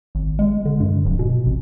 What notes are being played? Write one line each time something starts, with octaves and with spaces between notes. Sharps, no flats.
G#1
G#3
D3
G2
D1
B2
A1